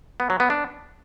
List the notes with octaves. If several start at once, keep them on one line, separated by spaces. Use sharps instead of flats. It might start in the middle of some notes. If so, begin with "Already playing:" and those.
B3
F#3
B3
D4